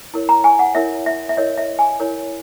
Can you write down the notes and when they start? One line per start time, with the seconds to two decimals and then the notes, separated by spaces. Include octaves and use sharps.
0.14 E4 A#4 C#5
0.29 A#5
0.44 G#5
0.59 F#5
0.75 E4 A#4 C#5 E5
1.06 E5
1.29 E5
1.37 E4 A#4 C#5 D#5
1.58 E5
1.79 G#5
2.00 E4 A#4 C#5